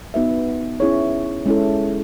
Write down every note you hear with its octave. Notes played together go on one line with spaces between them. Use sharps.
B3 D#4 F#4 B4 E5
C#4 E4 G#4 C#5
G#3 C#4 E4 A4